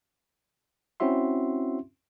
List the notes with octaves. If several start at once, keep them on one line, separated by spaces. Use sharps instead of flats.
C4 C#4 E4 F#4 E5 C6